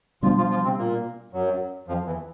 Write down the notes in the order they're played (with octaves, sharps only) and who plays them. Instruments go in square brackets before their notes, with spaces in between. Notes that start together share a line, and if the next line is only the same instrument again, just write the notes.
[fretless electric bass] B2 G3 B3 D4 [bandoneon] F3 F4
[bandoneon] F3 F4
F3 F4
C3 C4
A#2 A#3
F#2 F#3
F2 F3
E2 E3